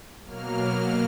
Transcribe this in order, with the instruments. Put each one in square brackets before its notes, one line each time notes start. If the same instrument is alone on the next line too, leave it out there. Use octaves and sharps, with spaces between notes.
[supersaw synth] B2 F#3 A#3 F6